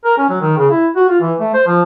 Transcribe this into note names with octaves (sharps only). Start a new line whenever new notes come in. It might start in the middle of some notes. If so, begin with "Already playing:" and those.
A#4
C#4
F#3
D#3
C#3
E4
F#4
F4
E3
A3
C5
F3